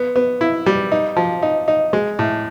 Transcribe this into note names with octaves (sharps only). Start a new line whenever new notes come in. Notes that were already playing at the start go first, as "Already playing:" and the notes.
Already playing: B3
B3
E4
G3
D#4
F3
D#4
D#4
G#3
A2